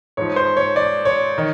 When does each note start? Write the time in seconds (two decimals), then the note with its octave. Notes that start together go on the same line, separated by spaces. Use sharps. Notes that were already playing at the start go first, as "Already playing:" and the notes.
0.17 G#2 F3 C#5
0.36 C5
0.57 C#5
0.76 D5
1.05 C#5
1.38 D#3